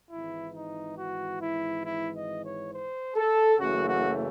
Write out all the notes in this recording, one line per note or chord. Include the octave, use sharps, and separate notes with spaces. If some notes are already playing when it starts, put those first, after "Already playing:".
G#1 G#2 E3 E4
D#4
F#4
E4
E4
D#5
C#5
C5
A4
F#1 F#2 C#3 E3 A3 F#4
F#4